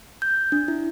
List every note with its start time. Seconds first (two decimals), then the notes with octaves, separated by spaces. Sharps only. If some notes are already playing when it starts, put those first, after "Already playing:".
0.22 G6
0.52 D4
0.68 E4